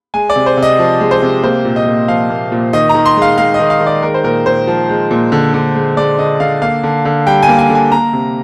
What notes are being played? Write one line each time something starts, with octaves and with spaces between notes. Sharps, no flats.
G#3 G#5
D5
C3
C5
C3
D#5
F3
G#3
C5
C3
A#3 C5
A#2
D#5
A#2
F3 F5
A#3
A#2
D#3 D#5
A#5
D#3
C6
G#3 F5
G#3 F5
D#5
D#3
F5
D#3
D5
G#3 A#4
C5
A#2 A#4
A#2 C5
F3
G#3
A#2
D3
D3
G#3
G#3 D5
D3 D#5
D3 F5
A#3 F5
D3
D3
G3 G5
G#5
A#3
G#5
D3
G#5
A#3 A#5
C3